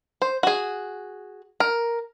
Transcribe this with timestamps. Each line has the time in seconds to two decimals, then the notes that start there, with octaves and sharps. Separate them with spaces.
0.22 C5
0.43 F#4 G#4
1.60 A#4